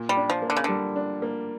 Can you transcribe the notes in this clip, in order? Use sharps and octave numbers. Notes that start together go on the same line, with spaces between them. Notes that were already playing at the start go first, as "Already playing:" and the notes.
Already playing: A#2
G3
D4
F3
A#3
D3
C#3
D3 G3
D4
A#3